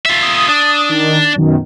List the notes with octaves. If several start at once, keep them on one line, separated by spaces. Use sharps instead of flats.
F4 E5
D#6
D4
D#3
F#2 B2 D#3